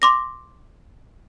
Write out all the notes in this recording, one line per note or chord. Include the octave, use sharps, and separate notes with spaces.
C6 D6 A#6